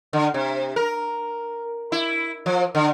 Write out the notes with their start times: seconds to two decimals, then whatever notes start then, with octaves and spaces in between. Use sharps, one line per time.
0.13 D3
0.34 C3
0.76 A#4
1.92 E4
2.46 F3
2.75 D3